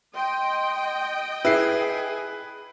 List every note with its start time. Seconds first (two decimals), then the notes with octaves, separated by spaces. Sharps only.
0.15 D#5 G5 C6
1.45 E4 G#4 B4 C7